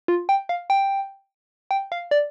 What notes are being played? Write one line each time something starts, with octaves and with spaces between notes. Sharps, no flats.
F4
G5
F5
G5
G5
F5
D5